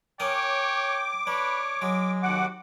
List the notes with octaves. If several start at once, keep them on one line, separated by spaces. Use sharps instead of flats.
C#4 A#4 C#5 G5 D6 D#6
D4 B4 C#5
F#3 G#3
D#2 F#4 F#5 D6